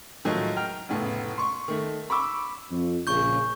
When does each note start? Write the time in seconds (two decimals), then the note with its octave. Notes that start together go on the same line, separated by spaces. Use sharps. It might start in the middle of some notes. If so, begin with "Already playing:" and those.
0.25 A2 D#3 F3 F#3 G#3
0.56 G5 A#5 F6
0.89 F1 A2 C#3 B3
1.38 C6 C#6
1.68 D#3 A3
2.10 B5 C#6 D6 E6
2.70 F2
3.07 A#1 C#3 C#6 G6